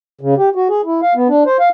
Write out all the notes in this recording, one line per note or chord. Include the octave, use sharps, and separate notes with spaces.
C#3
G4
F#4
G#4
E4
F5
B3
D4
C5
F5